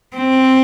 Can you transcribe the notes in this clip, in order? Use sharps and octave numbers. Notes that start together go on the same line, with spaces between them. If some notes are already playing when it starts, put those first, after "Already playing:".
C4